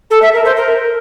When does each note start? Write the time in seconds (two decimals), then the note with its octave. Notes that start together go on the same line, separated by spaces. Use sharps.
0.10 A4
0.22 E5
0.33 A#4
0.45 C5
0.56 A#4